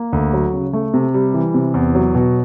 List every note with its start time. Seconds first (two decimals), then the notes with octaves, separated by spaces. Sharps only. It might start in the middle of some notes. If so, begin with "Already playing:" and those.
Already playing: A#3
0.13 D2
0.33 F#3
0.54 C#3
0.73 A3
0.94 C3
1.14 G3
1.34 E3
1.54 C3
1.74 E2
1.95 F#3
2.15 B2